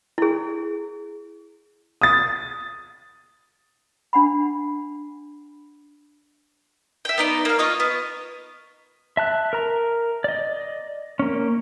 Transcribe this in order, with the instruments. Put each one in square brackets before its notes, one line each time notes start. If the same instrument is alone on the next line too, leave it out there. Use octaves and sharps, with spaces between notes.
[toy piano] E4 G#4
[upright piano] D#6 A6
[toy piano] D4 F#5 B5
[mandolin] E5 G5
B3 D#4 D5
A#3 F5
F4 D#5 C#6
B3
[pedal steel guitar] E5 A5 F#6
A#4 A#5
D5 D#5
A#3 C#4